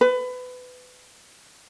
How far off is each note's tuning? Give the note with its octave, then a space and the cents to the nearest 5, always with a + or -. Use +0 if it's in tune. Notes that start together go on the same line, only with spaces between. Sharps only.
B4 +25